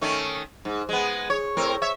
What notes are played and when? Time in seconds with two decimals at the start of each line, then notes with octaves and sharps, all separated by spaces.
0.01 D#3 A3 C#4
0.65 G#2
0.89 G#3 B3
1.30 C#5
1.57 A2 C4 A#4
1.82 C#5 E5